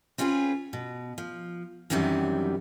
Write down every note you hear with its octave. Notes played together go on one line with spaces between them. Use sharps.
C4 C#4 F4 G#4 B4
B2
F3
F#2 C3 D#3 E3 F#3 G3